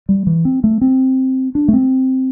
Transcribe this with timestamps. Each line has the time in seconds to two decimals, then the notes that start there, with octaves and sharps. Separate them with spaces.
0.09 G3
0.27 E3
0.45 C4
0.64 A3
0.81 C4
1.55 D4
1.68 A3
1.73 C4